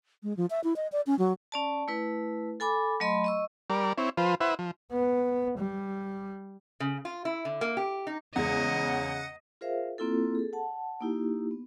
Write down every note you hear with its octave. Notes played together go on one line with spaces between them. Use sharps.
G#3
F3
E5
E4
D#5
D5
C#4
F#3
C#4 D5 A5
A3 E4 B4
A4 G#5 B5 D6
F#3 A3 D#5 B5 C6
D#5 C#6 E6
G3 A#4 D5
C4 E4 C#5
F3 F4 B4 C5
E4 B4 C5 E5 F#5
F3
B3
G3
C#3
F4
E4
D3
A#3
G4
D#4
E2 C#3 G#3 D#5 F#5
F4 G#4 A#4 C5 E5 F5
A#3 C4 E4 F4 A4
G#4 A4
F#5 A5
A#3 D#4 E4 G4
B3